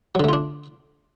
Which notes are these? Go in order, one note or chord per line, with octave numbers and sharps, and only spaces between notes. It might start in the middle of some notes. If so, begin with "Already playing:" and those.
D3 F#3 A3 D4 F4